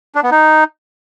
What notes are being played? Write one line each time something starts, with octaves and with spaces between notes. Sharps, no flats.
D4
B3
D#4